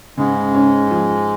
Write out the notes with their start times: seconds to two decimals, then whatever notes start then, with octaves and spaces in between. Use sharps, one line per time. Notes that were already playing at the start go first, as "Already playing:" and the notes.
0.17 G#2 C#3 G#3
0.54 C#4
0.91 F3